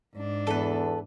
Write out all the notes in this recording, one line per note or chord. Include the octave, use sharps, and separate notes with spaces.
G#2 D4
E2 B3 A4 B4